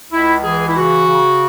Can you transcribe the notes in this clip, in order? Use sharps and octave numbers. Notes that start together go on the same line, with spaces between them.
C#2 E4
E3 G#4
E4
C#3 F#4
C#3